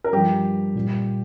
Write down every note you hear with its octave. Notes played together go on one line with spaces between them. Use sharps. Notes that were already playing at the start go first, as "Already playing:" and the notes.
A#4
G2 F3 G4
A#2 G3